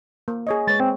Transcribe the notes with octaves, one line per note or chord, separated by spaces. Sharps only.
A#3
G#4 C#5 D#5
G#3 B4 C#5 A6
C4